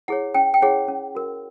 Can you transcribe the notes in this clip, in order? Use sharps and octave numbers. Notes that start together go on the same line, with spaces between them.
E4 G#4 C#5 F#5
C#4 G5
G5
E4 G#4 C#5 F#5
C#4
F#4 A#4